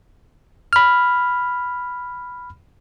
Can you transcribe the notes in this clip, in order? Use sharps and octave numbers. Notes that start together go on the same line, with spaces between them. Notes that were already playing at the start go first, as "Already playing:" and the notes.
B5 F6